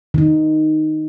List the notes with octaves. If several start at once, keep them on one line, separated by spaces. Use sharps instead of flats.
D#3 D#4